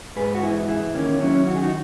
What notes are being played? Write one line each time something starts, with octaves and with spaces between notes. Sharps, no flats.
G#2 G#4 B4
F#4
E3 E4 G#4
E3 E4 G#4
D#3 A#3 C#4
F#3 C#4 E4
D#3 F#4
G#4
D#4 F#4